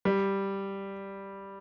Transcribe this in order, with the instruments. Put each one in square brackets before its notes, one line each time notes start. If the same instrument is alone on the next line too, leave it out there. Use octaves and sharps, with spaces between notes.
[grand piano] G3